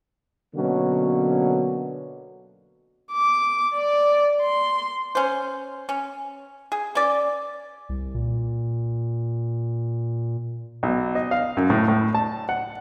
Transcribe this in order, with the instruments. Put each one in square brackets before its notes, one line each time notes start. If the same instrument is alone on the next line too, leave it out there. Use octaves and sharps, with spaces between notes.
[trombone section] B2 D3 F#3 A#3 C#4
[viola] D6
D5
C6
[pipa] C#4 C5
C#4
G#4
C#4 D5
[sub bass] C2
A#2
[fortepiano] B1
D#5
F5
F#2
A2
A2
A5
F#5